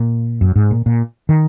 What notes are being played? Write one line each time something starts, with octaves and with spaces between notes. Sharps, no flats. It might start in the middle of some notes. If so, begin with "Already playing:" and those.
Already playing: A#2
F#2
G#2
A#2
A#2
D#3